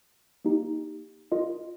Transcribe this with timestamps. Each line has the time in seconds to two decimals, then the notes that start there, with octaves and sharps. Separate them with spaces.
0.45 A#3 D#4 G4
1.32 F4 A#4 D#5